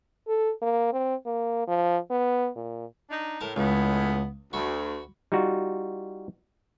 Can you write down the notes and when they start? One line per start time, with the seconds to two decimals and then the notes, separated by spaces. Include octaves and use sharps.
0.28 A4
0.62 A#3
0.93 C4
1.26 A#3
1.67 F3
2.11 B3
2.56 A#2
3.10 D4 D#4
3.41 A2 A#4 A5
3.56 C#2 A2 G#3 B3
4.53 D2 F#4 B5
5.32 G3 D#4 F4 F#4